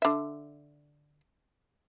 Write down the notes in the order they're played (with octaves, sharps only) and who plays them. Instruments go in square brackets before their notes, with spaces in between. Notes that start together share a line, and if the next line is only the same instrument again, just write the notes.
[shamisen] D3 E5